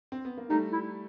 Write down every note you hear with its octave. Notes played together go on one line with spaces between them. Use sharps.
C4
B3
A#3
G3 A3 D#4
E4